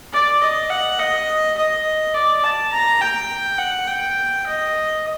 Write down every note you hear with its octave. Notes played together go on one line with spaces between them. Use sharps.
D5
D#5
F#5
D#5
D#5
D5
A5
A#5
G5
F#5
G5
D#5